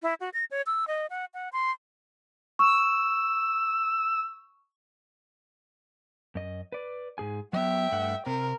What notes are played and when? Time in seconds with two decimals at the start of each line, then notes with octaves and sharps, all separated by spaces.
0.03 E4
0.20 F#4
0.34 A#6
0.51 C#5
0.67 E6
0.87 D#5
1.10 F#5
1.34 F#5
1.53 C6
2.59 C#6 E6
6.35 F#2 D#5
6.72 B4 D5
7.18 G#2 G#4 G#5
7.53 F#3 B3 E5 G5
7.92 G2 A3 F#5
8.27 C3 C4 A#4